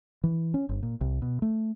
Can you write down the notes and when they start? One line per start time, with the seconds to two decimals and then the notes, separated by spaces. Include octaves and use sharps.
0.24 E3
0.54 C#4
0.69 G1
0.83 A#2
1.01 C2
1.22 B2
1.42 A3